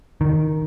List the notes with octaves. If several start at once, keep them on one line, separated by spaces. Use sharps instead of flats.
D#3